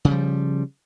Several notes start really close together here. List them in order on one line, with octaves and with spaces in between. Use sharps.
C#3 G3 F3